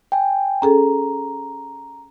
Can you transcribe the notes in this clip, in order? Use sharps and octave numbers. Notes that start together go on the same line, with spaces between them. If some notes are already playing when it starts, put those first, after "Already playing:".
G5 G#5
C#4 G#4 A4 A#5